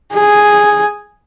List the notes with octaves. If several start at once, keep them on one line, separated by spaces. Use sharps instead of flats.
G#4